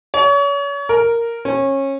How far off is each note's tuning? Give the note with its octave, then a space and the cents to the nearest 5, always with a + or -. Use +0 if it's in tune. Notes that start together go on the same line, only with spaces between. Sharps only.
C#5 +35
A#4 -5
C#4 -25